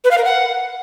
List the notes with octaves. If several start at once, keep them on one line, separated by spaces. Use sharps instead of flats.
B4
F5
A#4
F#5